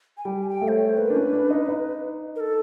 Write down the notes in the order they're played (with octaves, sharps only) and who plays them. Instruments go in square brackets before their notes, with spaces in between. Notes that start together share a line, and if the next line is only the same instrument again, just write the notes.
[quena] G#5
[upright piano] G3 [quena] G5
[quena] G#5
G5
[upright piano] A3
[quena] C5
C#5
C5
[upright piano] A#3 [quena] B4
[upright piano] D4
C#4
D4
D#4
D#4
[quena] A#4
A4